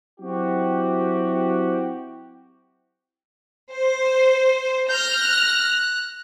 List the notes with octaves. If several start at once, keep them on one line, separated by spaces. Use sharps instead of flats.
F#3 C4 E4 F#4 G4
C5
F6 G6 A#6
F#6